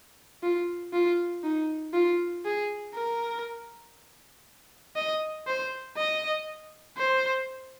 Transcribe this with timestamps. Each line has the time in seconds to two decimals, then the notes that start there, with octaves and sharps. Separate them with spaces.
0.43 F4
0.93 F4
1.44 D#4
1.94 F4
2.45 G#4
2.95 A#4
4.96 D#5
5.47 C5
5.97 D#5
6.98 C5